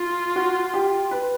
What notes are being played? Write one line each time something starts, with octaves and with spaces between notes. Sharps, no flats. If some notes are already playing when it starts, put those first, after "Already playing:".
Already playing: F4
F#4
G4
B4